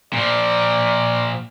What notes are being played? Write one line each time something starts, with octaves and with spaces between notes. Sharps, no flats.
A#2 F3 D5